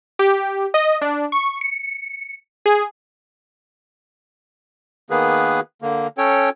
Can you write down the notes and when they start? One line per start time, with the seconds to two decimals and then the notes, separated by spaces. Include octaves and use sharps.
0.19 G4
0.74 D#5
1.02 D4
1.32 C#6
1.61 C#7
2.66 G#4
5.10 D#3 A#3 B3 G#4 B4
5.82 D3 A#3
6.18 C#4 A4 C#5 G5